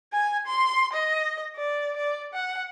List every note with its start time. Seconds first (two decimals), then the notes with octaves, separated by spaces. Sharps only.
0.13 G#5
0.47 C6
0.93 D#5
1.56 D5
1.96 D5
2.33 F#5